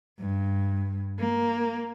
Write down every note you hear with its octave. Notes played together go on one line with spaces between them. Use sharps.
G2
A#3